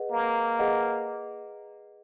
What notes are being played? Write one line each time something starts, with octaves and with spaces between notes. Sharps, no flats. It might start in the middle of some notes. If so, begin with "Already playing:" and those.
Already playing: G#4 B4 D#5 F#5
A#3
G#4 B4 D#5 F#5